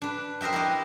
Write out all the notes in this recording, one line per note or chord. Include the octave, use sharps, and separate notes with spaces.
D4 B4
A#4 C5 D#5 E5 G5
E4 G4 B4 D#5